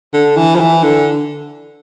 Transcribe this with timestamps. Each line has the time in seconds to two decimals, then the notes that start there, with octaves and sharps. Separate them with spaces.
0.14 D3
0.37 E3
0.55 F3
0.60 E3
0.83 D3